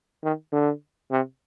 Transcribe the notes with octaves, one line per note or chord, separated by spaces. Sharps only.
D#3
D3
C3